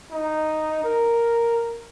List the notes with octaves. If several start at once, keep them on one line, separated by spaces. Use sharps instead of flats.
D#4
A#4